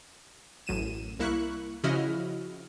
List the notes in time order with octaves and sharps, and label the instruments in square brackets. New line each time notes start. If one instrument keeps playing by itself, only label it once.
[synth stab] A1 F#2 D#7 E7
C2 A#3 E4 C#6 F#6
C#3 F3 E4 F#4 D#5 F6